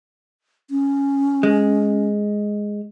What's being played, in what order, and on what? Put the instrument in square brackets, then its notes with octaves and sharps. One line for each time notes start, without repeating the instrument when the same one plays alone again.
[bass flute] C#4
[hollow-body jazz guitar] G#3